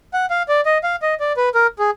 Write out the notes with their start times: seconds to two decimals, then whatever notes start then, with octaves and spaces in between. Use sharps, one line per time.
0.13 F#5
0.30 F5
0.48 D5
0.66 D#5
0.83 F5
1.02 D#5
1.20 D5
1.37 B4
1.55 A#4
1.79 G#4